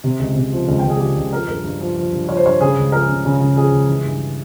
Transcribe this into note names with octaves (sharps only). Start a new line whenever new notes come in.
C3
C#2
C3
F3
C#2
G5
C#2
G#4
C#2 G4
C#2
F3 A#4
G2 A#4
G2
F3
F3
G2
F3 C#5
C5
G2 C#5
C#3 G#4
C#2
F3 A#4
C#3
C#3
C#3
F3 G#4
C#2
E3
G2